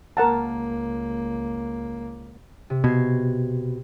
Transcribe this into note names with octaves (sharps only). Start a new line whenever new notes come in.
C#2 A#3 A#4 F#5 A5
C3
B2 G#6 C7